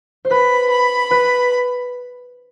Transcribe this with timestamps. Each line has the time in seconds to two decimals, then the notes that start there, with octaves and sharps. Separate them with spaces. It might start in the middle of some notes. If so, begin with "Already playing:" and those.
0.25 C5
0.31 B4 B5
0.71 B5
1.11 B4